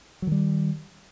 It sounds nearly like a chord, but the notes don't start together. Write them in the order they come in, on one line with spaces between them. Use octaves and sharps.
F#3 D#3 G3